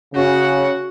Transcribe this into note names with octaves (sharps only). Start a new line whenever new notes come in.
C#3 C#4 F#4 F#5